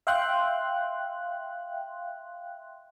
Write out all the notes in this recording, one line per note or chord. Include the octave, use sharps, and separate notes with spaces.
E5 F5 G5 C6 F#6